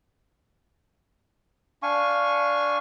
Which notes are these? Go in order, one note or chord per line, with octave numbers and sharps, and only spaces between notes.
D4 F5 G#5 C#6